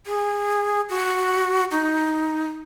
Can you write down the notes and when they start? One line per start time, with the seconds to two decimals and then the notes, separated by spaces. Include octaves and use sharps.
0.06 G#4
0.90 F#4
1.71 D#4